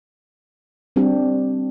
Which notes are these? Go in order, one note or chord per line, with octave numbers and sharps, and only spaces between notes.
G3 C4 D4 G4